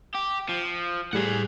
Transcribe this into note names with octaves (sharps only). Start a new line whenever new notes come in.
G4
F3
A2 G3 G#4 F#5